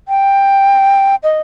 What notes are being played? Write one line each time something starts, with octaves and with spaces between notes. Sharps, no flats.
G5
D#5